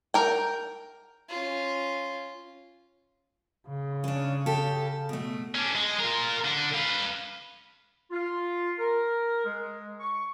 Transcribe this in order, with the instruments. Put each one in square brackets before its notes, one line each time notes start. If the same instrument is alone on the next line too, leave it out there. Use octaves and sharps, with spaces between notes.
[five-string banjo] A#4 G5
[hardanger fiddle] C#4 F4
[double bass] C#3
[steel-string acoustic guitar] C#4 D4
G4 A4
B2 A3
[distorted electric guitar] C#4 D4
G#3
F4 A#4
D3
B4 F5
[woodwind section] F4
A#4
G#3
C#6